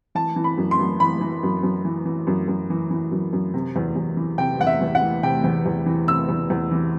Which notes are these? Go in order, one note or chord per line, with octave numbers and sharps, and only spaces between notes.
E3 A5
E3
B5
F#2
C6
F#2
E3 B5
E3
F#2
F#2
E3
E3
F#2
F#2
E3
E3
F#2
F#2
C3
E2
E2
E3
C3 G5
E2 F#5
E5
E2
F#5
E3
C3 G5
E2
E2
E3
C3 E6
E2
E2
E3